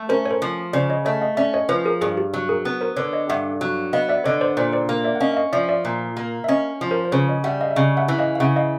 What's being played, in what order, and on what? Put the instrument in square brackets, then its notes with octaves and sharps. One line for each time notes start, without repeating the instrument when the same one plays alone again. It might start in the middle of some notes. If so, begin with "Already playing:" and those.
Already playing: [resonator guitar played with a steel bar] A3
[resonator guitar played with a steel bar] C#4 [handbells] A#4 C5
[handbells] C#5
A#4 C5
[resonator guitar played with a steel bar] F3
[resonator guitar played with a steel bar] C#3 [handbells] C5 D5
[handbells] C#5 D#5
[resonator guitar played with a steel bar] A3 [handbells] C#5 D#5
[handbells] D#5 F5
[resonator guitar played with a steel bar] C#4 [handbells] D5 E5
[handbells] C#5 D#5
[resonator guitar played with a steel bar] F3 [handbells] B4 C#5
[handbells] G#4 A#4
[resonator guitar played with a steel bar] G2 [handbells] G#4
[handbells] G4
[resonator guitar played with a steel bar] F#3
[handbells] G#4 A#4
[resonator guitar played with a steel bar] B3
[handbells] A#4 C5
[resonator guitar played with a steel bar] D3 [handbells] B4 C#5
[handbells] C#5 D#5
[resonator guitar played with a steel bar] G2 [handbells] E5 F#5
[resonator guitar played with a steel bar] F#3
[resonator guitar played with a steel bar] B3 [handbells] D#5 F5
[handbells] D5 E5
[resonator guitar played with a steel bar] D3 [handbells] C#5 D#5
[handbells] C5 D5
[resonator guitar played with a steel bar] A#2 [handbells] C5 D5
[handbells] C5 D5
[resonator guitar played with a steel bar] A#3
[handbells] D5 E5
F#5
[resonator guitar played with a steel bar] C#4 [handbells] D#5 F5
[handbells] E5
D#5 F5
[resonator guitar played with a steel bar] F3 [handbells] D5 E5
[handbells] D5 E5
[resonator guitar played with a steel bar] A#2
A#3
[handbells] E5
[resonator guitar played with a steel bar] C#4 [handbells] C#5 D#5
[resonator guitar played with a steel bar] F3
[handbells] A#4 C5
C5
[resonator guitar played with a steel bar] C#3 [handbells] B4 C#5
[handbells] C#5 D#5
[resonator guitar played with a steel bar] G3 [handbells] E5 F#5
[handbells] D#5 F5
E5
[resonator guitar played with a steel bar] C#3 [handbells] D#5 F5
[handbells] E5 F#5
[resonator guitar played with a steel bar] E3
[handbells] D#5 F5
F5
[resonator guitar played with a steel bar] C#3 [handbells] E5 F#5
[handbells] D#5 F5